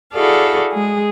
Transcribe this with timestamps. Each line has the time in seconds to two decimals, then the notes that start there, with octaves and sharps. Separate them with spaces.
0.13 E4 F#4 G#4 A4 D5 F5
0.72 G#3 G#4